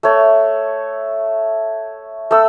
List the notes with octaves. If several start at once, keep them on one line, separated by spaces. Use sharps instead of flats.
A3 C#5
A3 E6